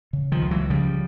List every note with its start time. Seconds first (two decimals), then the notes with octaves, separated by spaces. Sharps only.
0.13 C#3
0.32 D#3 F3
0.41 C#2
0.51 E3 F#3
0.70 C#3 F3 G3